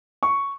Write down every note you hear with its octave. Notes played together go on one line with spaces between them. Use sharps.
C#6